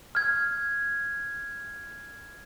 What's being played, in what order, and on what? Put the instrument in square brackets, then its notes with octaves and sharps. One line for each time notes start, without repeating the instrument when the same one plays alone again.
[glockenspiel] F6 G#6